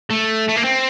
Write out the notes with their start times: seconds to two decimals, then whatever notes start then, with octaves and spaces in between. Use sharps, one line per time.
0.10 A3
0.48 A3
0.56 A#3
0.64 C4